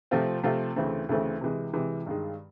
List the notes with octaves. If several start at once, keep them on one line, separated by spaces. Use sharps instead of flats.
C3 F3 A3 C4 F4
C3 F3 A3 C4 F4
D2 C#3 E3 A3 C4
D2 C#3 E3 A3 C4
C3 E3 G#3
C3 E3 G#3
G2 D#3 G#3